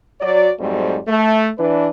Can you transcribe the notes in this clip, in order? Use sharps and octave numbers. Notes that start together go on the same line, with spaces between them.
F#3 D5
F2 G#2 F#3 G3 A3 C4
A3
E3 D4 B4